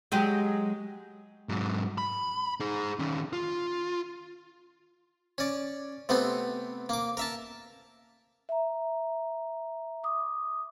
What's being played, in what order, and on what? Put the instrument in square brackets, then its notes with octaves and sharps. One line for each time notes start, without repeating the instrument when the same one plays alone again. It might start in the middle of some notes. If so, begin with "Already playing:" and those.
[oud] F#3 G#3 G4
[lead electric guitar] G#2 F#3
B5
D#4 G#4
D#3 C#4
F4
[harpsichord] C#4 D5
C3 A3 B3 C4
A#3 D6
A#4 E5 A5
[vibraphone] E5 A#5
D6 D#6